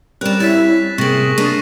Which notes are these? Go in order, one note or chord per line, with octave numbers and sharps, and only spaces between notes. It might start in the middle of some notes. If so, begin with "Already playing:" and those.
G3 C4 C#4 A#4 D5 F#6 E7
E4 C#5 A6 B6
C3 A#3 G#4 C#6 A#6 F#7
A#3 D4 C#6 A#6 D#7